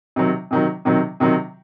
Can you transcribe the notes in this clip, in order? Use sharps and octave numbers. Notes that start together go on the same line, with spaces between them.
C3 D#3 F#3
C3 D#3 F#3
C3 D#3 F#3
C3 D#3 F#3